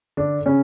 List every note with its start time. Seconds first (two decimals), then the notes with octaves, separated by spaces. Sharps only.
0.17 D3 D4
0.46 C#3 C#4